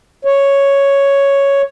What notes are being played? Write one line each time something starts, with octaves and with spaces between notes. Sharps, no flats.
C#5